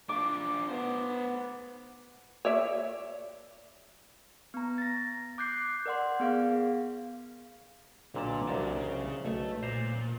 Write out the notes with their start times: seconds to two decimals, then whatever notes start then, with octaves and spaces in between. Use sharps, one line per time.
0.09 D4 F4 D6
0.69 B3 C5 F#5
2.45 C#5 D5 E5
4.54 B3 A#5
4.78 A6 A#6
5.38 D6 F#6 G6 C7
5.86 A#4 D5 F#5 C6
6.19 B3 G#4 F5
8.14 B1 A#2 D3 A5
8.47 C2 D3 F#3 A5
8.75 C#3
9.25 B1 A3
9.63 A#2 C5 A#5